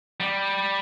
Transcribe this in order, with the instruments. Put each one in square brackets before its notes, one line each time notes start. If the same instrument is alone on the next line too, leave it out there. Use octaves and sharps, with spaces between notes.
[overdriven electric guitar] G3